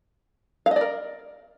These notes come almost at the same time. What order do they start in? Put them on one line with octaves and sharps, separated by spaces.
F5 D#5 D5 A#4